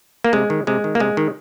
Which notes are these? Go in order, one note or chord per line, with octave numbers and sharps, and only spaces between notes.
A#3
C3 G#3
D#3
C3 G#3
D#3
A#3
C3 G#3
D#3